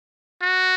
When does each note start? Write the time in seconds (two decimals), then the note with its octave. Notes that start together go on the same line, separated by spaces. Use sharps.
0.42 F#4